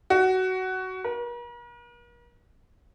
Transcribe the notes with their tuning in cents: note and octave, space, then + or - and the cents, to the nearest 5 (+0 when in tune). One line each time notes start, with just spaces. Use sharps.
F#4 +15
A#4 +45